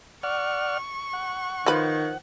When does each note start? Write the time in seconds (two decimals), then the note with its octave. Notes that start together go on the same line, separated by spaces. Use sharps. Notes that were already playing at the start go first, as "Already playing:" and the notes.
0.23 D5 F#5 C#6 F6
1.13 F#5
1.66 D#3 F3 B4